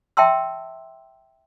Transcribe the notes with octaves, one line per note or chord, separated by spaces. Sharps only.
E5 G5 A5 C6 E6